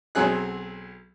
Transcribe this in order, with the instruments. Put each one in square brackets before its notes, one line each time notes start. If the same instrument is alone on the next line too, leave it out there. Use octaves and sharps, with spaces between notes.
[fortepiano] B1 F#3 C4 G#4 F#6